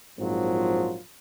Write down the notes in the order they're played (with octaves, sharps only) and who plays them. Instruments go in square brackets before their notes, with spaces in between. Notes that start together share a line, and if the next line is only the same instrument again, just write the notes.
[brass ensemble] A#1 G#2 F3 F#3 C4 F4